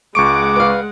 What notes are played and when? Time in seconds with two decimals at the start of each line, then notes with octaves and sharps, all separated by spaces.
0.15 C#2 G#3 F#5 C#6 D6 D7
0.56 B4 F5